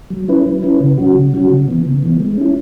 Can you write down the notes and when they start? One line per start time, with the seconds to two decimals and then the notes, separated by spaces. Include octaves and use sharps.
0.10 F#3
0.28 C#4 E4 B4
0.46 F#3
0.63 C#4 E4 B4
0.80 C#3
0.98 F#3 C#4 F#4
1.16 C#3
1.33 F#3 C#4 F#4
1.50 C#3
1.68 E3 B3
1.85 C#3
2.03 E3 B3
2.20 G#3
2.38 C#4 E4